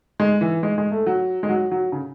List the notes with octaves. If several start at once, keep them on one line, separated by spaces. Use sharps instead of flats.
G#3
E3
G#3
G#3
A3
F#3
G#3
F#3
F#3
C#3